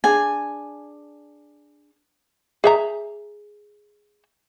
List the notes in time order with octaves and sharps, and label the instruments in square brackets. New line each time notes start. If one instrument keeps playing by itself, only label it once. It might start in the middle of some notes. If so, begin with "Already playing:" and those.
[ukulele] D4 G#4 [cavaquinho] G#5
[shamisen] G#4 E5 A#5